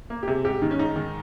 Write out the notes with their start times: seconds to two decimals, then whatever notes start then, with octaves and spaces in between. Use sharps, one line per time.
0.10 A#3
0.23 G4
0.28 C3 G#4
0.44 G#2 G4
0.62 D#3 D#4
0.71 C#4
0.79 G#2 D#4
0.96 D#3